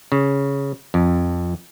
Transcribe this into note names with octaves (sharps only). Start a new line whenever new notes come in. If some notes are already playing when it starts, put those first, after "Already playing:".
C#3
F2